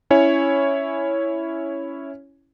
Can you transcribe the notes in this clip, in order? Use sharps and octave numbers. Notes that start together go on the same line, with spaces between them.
C#4 E4 C#5 G#5